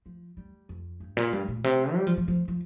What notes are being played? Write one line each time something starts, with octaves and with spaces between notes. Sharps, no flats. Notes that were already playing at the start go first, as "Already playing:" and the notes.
F3
G3
F2
G2
A#2
G2
A#2
C3
G3
F3
F3
F3
F3